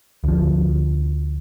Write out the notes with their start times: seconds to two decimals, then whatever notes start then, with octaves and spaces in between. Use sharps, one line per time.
0.24 D2 F3